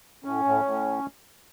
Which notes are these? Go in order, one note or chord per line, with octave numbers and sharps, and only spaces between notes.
A2 C#4
A2
A2